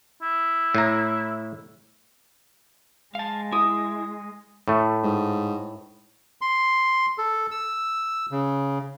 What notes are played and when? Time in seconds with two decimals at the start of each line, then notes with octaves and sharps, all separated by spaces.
0.22 E4
0.75 A2 A#5
3.15 G#3 F5 A5
3.52 E4 D#6
4.68 A2 A3
5.04 G#2
6.41 C6
7.18 A4
7.51 E6
8.31 C#3